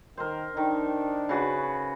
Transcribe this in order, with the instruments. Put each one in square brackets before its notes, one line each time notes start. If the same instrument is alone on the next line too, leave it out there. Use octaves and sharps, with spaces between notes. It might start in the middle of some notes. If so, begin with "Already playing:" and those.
[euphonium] D#3 [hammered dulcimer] A#4 C5
[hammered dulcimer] D#3 [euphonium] D4
[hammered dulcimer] C#3 F#4 B4